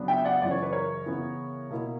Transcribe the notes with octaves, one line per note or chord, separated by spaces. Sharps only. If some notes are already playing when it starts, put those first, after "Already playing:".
Already playing: C#3 F#3 B3 D4
E5 G5
D5 F#5
F#2 C#3 E3 D5
C#5
B4
A#4 C#5
C#3 E3 B3 E4
B2 A#3 E4